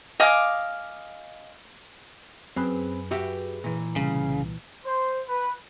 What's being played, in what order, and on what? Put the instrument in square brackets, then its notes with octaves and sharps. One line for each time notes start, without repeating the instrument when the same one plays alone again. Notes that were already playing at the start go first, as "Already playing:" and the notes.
[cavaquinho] D#5 F5 G#5 D6
[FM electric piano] F#2 G#4 B4 [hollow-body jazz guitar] C4
[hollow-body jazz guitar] F#4 G4 E5
A#2 E3
[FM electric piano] C2 [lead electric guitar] C#3
[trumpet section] C5
B4